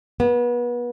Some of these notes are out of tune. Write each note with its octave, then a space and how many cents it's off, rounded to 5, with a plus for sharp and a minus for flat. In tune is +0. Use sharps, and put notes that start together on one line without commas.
B3 -30